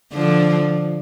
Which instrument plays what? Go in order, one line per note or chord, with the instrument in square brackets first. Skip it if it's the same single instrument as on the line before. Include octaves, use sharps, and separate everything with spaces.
[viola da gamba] D3 F3